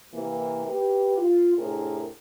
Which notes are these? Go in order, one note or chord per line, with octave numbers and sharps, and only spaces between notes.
C3 E3 A#3
G4 B4
F4
A2 C3 D4 G#4 A#4